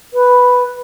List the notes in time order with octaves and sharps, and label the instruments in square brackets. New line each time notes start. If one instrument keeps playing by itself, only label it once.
[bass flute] B4